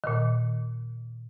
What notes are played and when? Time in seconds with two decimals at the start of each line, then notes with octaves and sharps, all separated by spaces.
0.04 A#2 D#3